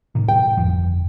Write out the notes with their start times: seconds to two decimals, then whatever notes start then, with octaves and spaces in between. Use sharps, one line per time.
0.15 A2 C3 D#3
0.29 G5
0.57 G1 F2 F3